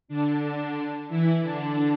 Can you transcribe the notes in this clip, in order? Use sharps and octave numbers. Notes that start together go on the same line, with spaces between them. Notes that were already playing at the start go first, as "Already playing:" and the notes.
D3 D4
E3 E4
D3 D4